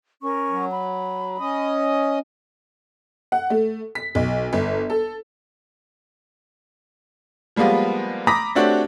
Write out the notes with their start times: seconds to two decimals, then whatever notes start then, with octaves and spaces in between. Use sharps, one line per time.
0.22 C#4 A#4 C#6
0.50 F#3
0.69 B5
1.39 C#4 D#5
3.32 F#5
3.50 A3
3.95 B6
4.15 B1
4.53 G1
4.90 A4
7.56 F3 G3 G#3 A#3 B3
8.27 A#5 B5 D6 D#6 A#6 B6
8.55 A3 C4 D4 F#4 G4 C#5